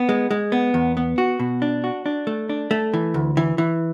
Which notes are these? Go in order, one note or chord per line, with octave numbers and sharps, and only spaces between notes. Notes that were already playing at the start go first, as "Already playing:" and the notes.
Already playing: B3
G#3
G#3
B3
E2
B3
F#4
B2
D4
F#4
D4
A3
D4
A3
E3
D2
E3
E3